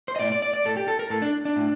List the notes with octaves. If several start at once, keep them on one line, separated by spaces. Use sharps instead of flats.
C5
D#5
A2 D5
D5
D5
D5
A2 A4
G4
A4
A#4
A2 A4
D4
D4
A2